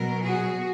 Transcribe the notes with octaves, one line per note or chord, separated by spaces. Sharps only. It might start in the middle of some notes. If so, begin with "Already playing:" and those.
Already playing: B2 F#3 A#4
F#4 G#4